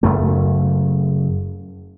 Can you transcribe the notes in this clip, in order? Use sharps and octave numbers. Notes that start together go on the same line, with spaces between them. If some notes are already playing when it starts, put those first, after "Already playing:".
F#1 F#2 A3